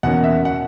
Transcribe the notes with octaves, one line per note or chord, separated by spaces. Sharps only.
E2 B2 A#3 C#4 F#5
E5
F#5